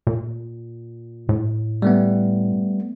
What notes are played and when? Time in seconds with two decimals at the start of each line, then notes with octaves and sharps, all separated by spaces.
0.07 A#2
1.29 A2
1.82 G3 A3 B3